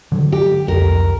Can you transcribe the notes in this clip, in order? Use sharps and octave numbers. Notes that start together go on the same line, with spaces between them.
D3 F#3
G4
C2 F2 A#4